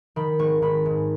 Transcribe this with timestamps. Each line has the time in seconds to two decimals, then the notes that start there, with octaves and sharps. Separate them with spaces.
0.16 D#3 B5
0.39 G#1 C#6
0.62 G#1 B5
0.85 G#2